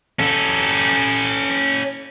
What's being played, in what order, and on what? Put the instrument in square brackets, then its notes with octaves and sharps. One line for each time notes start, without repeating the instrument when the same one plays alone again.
[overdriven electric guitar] C#4 A4